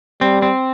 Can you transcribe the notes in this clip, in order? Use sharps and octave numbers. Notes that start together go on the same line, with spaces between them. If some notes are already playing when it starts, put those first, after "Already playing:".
G3 C4
C4